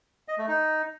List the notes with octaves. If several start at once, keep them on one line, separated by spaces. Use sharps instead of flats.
D#5
A3
D#4